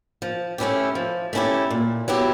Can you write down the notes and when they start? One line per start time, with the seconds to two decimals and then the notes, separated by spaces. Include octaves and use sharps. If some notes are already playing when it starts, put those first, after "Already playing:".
0.22 F3
0.58 A3 C#4 E4 G4
0.95 F3
1.33 A3 C#4 E4 G4
1.70 A#2
2.08 F#3 B3 E4 G4